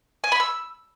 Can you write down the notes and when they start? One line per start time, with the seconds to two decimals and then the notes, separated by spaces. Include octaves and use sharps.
0.24 G#5
0.32 B5
0.40 E6